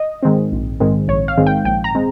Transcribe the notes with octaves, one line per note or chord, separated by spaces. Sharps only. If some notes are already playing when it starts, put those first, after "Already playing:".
Already playing: D#5
G#2 D#3 G#3 C4
A#1
G#2 D#3 G#3 C4
A#1 C#5
F5
G#2 D#3 G#3 C4
G5
A#1 G5
A#5
G#3 C4